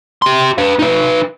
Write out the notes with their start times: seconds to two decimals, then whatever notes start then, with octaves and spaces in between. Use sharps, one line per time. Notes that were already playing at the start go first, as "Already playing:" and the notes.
0.22 G4 C6
0.58 B4 F5
0.79 D#4 B4